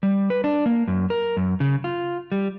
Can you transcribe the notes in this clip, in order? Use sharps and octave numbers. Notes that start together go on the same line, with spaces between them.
G3
B4
D4
A#3
F#2
A#4
F#2
C#3
F4
G3